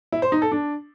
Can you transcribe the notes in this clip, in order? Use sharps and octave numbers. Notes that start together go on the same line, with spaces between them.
E4
C5
D#4
A4
D4